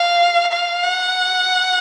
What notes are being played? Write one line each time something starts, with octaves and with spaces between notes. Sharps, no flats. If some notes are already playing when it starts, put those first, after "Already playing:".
Already playing: F5
F5
F#5